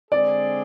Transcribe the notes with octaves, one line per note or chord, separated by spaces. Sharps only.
D3 G#3 C4 G#4 D5